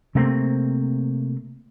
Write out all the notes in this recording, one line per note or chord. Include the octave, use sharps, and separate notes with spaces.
C3 A3 A#3 C4